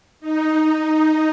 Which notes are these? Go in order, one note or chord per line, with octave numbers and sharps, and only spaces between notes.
D#4